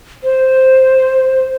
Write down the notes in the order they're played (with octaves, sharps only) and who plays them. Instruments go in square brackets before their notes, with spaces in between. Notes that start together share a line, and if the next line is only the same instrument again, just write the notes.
[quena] C5